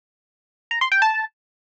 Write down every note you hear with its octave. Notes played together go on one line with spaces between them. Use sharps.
A#5
C6
G5
A5